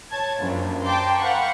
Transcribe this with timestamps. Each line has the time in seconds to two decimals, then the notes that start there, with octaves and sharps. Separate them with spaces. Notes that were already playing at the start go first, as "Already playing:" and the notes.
0.10 C#5 A5 G#6
0.42 A#1 F#2
0.85 G5 A5 A#5 C6 D6
1.19 A#4 C5 F5 F#5 B5 C#6